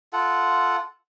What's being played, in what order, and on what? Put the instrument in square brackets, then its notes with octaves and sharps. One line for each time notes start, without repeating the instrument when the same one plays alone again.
[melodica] F4 A4 F#5